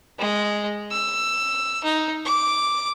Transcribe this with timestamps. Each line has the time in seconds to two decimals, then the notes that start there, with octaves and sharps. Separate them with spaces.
0.19 G#3
0.92 E6
1.84 D#4
2.25 D6